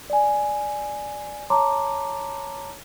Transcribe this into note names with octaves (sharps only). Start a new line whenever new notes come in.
D5 G#5
C#5 A5 A#5 C6 D6